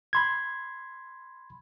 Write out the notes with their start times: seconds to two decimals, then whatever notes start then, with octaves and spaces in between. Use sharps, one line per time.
0.13 B5 C6 G#6